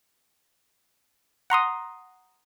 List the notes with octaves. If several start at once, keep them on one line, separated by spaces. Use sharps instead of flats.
F#5 A#5 C6 D#6